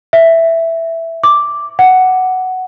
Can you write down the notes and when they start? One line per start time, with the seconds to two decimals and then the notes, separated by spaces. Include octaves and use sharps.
0.13 E5
1.23 D6
1.79 F#5